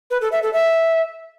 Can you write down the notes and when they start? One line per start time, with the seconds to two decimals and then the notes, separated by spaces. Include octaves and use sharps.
0.11 B4
0.21 A4
0.32 E5
0.43 A4
0.53 E5